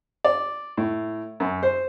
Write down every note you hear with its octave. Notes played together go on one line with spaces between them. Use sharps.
D5
A2
F#2
C5